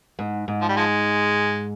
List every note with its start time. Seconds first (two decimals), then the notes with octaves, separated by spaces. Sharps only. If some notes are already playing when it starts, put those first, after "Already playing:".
0.19 G#2
0.48 G#2
0.61 F3
0.69 G3
0.76 F3 G#3